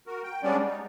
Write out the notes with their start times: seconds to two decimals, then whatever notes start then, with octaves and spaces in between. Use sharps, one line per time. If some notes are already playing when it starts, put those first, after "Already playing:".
0.07 F#4 A#4
0.23 G5
0.43 G3 G#3 B3 C#4 D4 D5
0.65 D#4